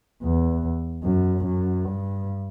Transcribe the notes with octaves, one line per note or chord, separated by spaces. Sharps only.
E2
F#2
F#2
G2